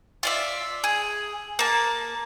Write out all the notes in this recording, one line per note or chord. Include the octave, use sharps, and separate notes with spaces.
F4 D5 E5
G#4
A#3 A5